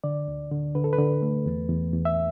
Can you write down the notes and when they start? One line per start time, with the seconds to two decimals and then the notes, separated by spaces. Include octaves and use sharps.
0.04 D3 D5
0.28 D2
0.51 D3
0.75 D3 B4
0.84 A4
0.93 B4
0.98 D3
1.22 A3
1.46 E2
1.70 E2
1.93 E2
2.05 E5